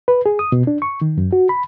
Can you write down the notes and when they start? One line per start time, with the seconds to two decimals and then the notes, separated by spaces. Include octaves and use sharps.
0.08 B4
0.26 G#4
0.39 D#6
0.52 B2
0.67 D4
0.82 C#6
1.01 D#3
1.18 F#2
1.33 F#4
1.49 B5